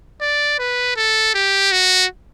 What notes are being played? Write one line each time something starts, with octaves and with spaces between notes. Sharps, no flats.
D5
B4
A4
G4
F#4